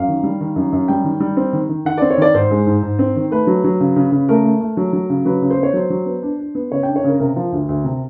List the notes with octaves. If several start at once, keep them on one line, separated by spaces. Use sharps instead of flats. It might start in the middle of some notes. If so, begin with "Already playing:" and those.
Already playing: F#2 F5
D#3
G3
D#3
F#2
F#2
G3 G5
D#3
G3
C4
D#3
D#3
D#3 F#5
C4 D5
C#5
D#3 D5
G#2 C5
G#3
G#2
G#2
C4
D#3
A3 B4
F#3
F#3
C#3
C#3
C#3
A3 A#4
A3
A3
F#3
F#3
C#3
F#3 B4
C#3
C5
B3
C#5
F#3 C5
F#3
B3
D4
D4
B3
C#3 C#5
D4 G5
C#5
C#3 A#4
C3 A#4
F3
D2
D2
C3